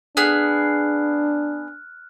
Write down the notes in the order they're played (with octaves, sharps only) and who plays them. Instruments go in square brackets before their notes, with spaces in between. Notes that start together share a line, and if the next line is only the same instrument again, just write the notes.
[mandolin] B3 G#4 [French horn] D4 [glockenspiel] F6 F#6